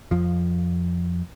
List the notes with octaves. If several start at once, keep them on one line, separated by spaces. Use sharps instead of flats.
F2 F3